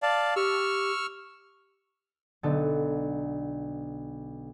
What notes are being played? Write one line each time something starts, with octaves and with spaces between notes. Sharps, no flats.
D5 F5 A5
G4 C#6 E6 F6
B1 D3 B3 A4 A5